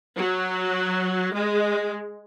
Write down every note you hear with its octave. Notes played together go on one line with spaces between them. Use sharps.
F#3
G#3